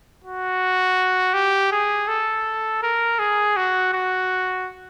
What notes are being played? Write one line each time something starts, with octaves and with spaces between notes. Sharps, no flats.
F#4
G4
G#4
A4
A#4
G#4
F#4
F#4